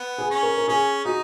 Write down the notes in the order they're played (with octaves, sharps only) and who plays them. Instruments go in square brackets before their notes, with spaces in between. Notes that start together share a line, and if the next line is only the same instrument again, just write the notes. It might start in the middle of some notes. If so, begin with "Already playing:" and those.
Already playing: [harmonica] B3
[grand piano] G#4
[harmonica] C#4
[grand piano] A#4
A#4
[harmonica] C#4 [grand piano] G#4
[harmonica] D#4 [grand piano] F#4